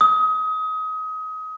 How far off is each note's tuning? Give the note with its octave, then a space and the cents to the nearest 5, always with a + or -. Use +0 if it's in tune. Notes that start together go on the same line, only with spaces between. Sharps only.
D#6 +25